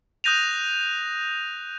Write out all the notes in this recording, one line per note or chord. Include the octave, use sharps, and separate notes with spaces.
D#6 F#6 G6 A#6 D#7 F7